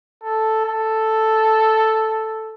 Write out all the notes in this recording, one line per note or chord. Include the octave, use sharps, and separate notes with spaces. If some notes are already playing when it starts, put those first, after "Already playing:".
A4
A4